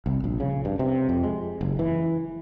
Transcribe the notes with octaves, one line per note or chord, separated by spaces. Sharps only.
C2
A#1
C#3
G2
C3
F2
G#3
F#1
E3